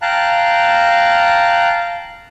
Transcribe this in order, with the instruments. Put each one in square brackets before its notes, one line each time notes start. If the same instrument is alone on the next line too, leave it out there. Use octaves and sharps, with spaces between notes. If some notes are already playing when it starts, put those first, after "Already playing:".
[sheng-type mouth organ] F5 G5 A5 A#5 F#6